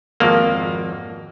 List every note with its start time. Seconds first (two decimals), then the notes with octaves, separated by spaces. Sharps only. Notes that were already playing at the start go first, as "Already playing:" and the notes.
0.20 G#1 F2 A#3